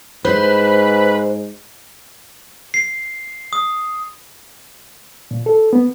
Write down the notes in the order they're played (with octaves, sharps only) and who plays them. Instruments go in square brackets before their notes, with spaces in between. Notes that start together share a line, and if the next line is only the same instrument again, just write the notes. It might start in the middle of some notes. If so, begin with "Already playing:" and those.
[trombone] G#2 [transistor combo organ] B4 [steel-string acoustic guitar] C5
[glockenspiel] C7
D#6
[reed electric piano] A#2
A4
B3